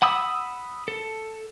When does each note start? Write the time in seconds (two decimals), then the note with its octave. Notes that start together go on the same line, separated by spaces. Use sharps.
0.02 F#5 B5 D#6 E6
0.88 A4